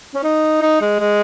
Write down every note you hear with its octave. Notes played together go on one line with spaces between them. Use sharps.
C#4
D#4
D#4
G#3
G#3